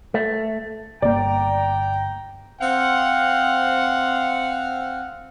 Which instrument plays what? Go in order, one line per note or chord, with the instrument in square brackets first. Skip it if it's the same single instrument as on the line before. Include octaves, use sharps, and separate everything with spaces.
[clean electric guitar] A3
[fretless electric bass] G1 A#3 [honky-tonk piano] D5 [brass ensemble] G5 A#5
[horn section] C4 F5 F#5